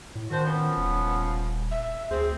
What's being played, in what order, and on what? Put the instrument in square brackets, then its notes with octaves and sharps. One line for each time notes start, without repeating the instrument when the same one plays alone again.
[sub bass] A2
[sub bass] D#3 [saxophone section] D4 F#4 C5
[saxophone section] F3 B3 C#4
[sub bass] D#1
[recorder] E5
[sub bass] D2 [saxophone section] C4 C5 [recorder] G#4